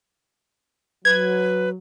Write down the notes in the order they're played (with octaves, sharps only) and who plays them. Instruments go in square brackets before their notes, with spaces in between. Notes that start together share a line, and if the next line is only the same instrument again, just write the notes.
[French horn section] F#3 [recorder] B4 [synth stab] G#6